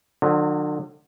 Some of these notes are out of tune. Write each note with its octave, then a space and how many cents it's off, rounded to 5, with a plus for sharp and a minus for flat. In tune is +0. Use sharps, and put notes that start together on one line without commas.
D3 +35 F#3 -30